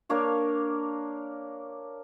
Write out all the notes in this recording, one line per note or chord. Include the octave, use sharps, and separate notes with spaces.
A#3 D4 C#5 F5